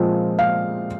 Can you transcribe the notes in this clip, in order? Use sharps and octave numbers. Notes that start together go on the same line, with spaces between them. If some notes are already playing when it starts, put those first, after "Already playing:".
Already playing: A#2 F3 G#3 C4
F5